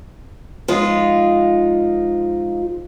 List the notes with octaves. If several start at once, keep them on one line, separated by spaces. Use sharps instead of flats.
F3 G#3 D#4 F4